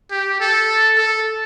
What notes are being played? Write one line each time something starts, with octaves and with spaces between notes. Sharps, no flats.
G4
A4
A4